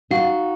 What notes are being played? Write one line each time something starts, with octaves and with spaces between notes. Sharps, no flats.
D#4 F#4 F5